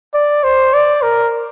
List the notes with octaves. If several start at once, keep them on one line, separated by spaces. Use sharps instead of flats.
D5
C5
D5
A#4